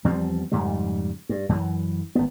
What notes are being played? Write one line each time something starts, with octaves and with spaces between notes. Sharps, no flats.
E2 F3 G3 C4
F2 G#2 C#3 G3
G2
F#2 E3
G#1 B3